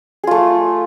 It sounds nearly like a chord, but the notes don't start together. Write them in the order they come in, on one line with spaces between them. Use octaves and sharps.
G#4 F4 A3